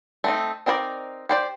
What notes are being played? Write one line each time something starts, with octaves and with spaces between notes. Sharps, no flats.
A3 C4 D#4
C4 D#4 A#4 C5 D5
G4 C5 D5